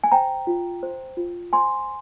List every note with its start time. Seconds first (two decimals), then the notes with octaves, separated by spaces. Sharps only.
0.04 G#5
0.12 C5 G5 A#5
0.47 F4
0.83 C5
1.17 F4
1.53 C5 G#5 C6